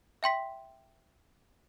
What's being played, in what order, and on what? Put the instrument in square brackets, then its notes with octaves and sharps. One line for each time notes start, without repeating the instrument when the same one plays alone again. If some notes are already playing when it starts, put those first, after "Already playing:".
[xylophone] E5 G5 C6 B6